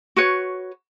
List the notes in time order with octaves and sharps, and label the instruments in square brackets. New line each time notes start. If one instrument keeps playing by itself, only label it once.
[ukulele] F#4 B4 C#5